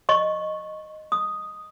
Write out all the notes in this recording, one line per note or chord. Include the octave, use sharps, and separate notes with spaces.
D#5 C#6
D#6